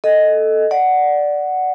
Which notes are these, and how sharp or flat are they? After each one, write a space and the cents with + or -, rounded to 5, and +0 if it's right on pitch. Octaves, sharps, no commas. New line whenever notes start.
A4 +0 D#5 +0
D5 +0 F#5 +0